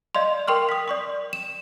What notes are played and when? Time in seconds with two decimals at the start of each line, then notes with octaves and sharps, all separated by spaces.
0.15 D5 D#5 F5 C6
0.48 A#4 G5 C6 C#6 F6
0.69 D#6 B6
0.88 D5 C#6 D#6
1.33 E7